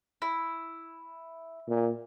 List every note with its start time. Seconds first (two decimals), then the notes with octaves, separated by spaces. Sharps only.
0.22 E4
1.68 A#2